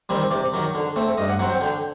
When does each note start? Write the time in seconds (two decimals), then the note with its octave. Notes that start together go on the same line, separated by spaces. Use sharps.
0.09 D#3 G3 C4
0.31 C3 D5
0.53 D#3 F#3
0.75 D3
0.96 A3 C4
1.18 G2 D#5
1.29 F#5
1.39 F#3 C4 F#5
1.50 G5
1.61 D3 G5